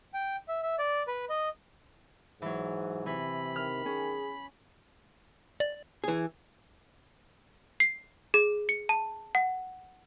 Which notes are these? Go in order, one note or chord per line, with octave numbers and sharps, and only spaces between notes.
G5
E5
E5
D5
B4
D#5
G#2 E3 F#3
C3 E3 B5
D#3 F6
C#4 G#4
D5
E3 G#4
C7
G#4
C#7
A5
F#5